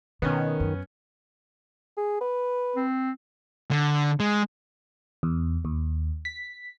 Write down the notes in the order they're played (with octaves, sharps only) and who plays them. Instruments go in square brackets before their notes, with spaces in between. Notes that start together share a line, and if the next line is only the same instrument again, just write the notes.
[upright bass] B2 [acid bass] D#3 [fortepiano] B3 C#4
[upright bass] F#2
[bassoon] G#4
B4
[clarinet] C4
[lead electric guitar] D3
G#3
[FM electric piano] E2
D#2
B6